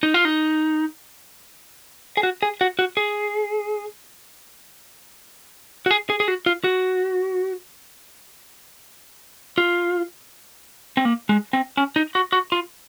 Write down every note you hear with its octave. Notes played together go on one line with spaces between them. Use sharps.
D#4
F4
D#4
G#4
F#4
G#4
F#4
F#4
G#4
F#4
G#4
G#4
G#4
F#4
F4
F#4
F4
C4
A#3
G#3
C4
C#4
D#4
F#4
F#4
F4